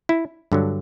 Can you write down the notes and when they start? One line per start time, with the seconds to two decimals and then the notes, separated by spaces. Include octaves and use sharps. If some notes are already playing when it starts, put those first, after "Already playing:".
0.09 E4
0.52 G2 D3 F#3